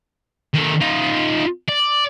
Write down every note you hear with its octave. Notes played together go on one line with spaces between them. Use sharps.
D#3 A4
D#4 F4
D5